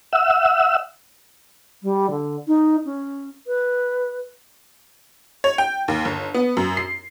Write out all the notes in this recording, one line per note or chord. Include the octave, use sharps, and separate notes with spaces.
E5 F#5 E6
G3
D3
D#4
C#4
B4
C#5
G5
D#2
G1
B3
F#2
C7